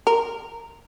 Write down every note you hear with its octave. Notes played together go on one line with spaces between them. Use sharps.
A#4